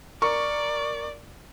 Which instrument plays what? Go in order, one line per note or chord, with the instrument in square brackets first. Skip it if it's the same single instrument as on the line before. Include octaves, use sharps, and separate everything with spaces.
[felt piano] A#4 C#6 [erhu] D5